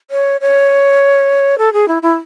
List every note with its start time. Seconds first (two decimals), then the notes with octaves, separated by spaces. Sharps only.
0.11 C#5
0.41 C#5
1.58 A4
1.73 G#4
1.88 E4
2.02 E4